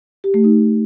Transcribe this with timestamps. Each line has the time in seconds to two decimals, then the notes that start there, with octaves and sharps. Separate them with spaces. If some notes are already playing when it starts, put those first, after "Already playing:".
0.24 G4
0.34 A3
0.44 D#4